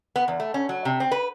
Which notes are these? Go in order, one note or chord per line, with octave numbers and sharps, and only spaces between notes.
B3
E2
A3
C#4
F#3
C3
C4
B4